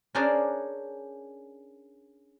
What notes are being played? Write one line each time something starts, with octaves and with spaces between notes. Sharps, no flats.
C#4 D4 G#4 A#4 C5 D5